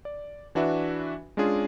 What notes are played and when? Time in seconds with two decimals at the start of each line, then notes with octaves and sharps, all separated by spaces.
0.05 D5
0.55 E3 D4 F#4 B4 E5
1.37 G#3 C#4 D4 F4 G#4